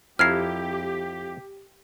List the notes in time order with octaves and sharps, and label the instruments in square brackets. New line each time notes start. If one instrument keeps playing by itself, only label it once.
[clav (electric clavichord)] F2 E4 A#5 [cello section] G4 [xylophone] F6 G#6 C7